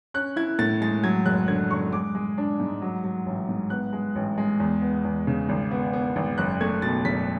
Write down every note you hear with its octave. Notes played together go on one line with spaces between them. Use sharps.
C#4 F#6
E4 G#6
A2 A6
G#3 A6
F#3 G#6
F#1 F#6
D3 G#6
F#1 C#6
G#3 D6
G#3
D4
G#2
F#3
F#3
A1
G#2
B3 F#6
G#3
A1
G#3
E2
B3
E2
C#3
G#1
B3
B3
G#1
F#1 F#6
A3 G#6
B2 A6
F#1 B6